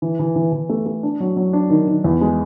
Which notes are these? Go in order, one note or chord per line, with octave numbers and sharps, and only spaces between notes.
E3
E3
E3
E3
A3
A3
D4
F#3
F#3
D4
D#3
D#3
E2
G#3